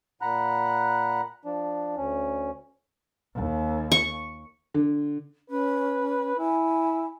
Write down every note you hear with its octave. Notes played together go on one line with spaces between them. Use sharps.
A#2 F#5 A#5 B5 F#6
F3 D4
D2 C#4
D#2
C#6
D3
C#4 B4
E4 G#5